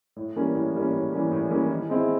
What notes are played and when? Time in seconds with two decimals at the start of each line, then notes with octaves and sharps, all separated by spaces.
0.16 A2
0.36 E3 G3 A#3 C#4
0.55 A2
0.74 E3 G3 A#3 C#4
0.93 A2
1.12 E3 G3 A#3 C#4
1.32 A2
1.50 E3 G3 A#3 C#4
1.70 D#3
1.89 G#3 C4 E4